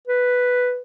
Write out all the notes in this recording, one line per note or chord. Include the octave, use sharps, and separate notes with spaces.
B4